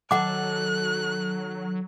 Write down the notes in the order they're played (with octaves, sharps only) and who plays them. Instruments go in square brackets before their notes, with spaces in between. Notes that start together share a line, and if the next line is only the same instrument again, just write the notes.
[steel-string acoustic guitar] D#3 A4 A5 [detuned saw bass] F#3 [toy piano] F#5 D6 [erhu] F#6